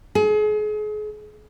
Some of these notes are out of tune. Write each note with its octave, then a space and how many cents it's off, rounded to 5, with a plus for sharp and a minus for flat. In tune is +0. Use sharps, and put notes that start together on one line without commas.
G#4 +35